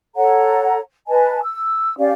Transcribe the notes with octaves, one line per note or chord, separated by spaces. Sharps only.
A4 C#5 F#5 A#5
B4 D#5 G#5 A5
E6
C#4 G4 D5 F5